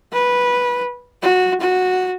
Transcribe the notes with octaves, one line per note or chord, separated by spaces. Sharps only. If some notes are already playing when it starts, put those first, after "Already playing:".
B4
F#4
F#4